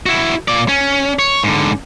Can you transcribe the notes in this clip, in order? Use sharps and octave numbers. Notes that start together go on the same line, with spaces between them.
E4 F#4
A#2 D5
C#4
C#5
G#2 D3